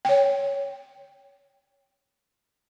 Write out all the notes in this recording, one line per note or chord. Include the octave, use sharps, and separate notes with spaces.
C#5 G5